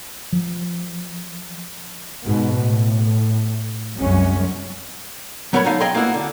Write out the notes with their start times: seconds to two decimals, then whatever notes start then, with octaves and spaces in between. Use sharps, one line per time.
0.33 F3
2.24 G#2 B2
2.56 A2
3.97 C2 F#2 F#3 G#3 C#4
5.53 F#3 B3 A#4 C#5 B5
5.65 D3 F#3 D#4 F5
5.80 B1 G#4 D#5 G5 A#5 C6
5.95 A#3 B3 E4 F#4
6.14 D3